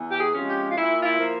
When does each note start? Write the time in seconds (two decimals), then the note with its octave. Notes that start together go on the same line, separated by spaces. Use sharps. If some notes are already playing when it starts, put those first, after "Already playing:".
Already playing: E2
0.11 G4
0.20 G#4
0.35 C3 F3 G#3 C#4
0.49 G4
0.71 F4
0.76 A#2 E4
1.01 F4
1.05 E4
1.19 F3 A#3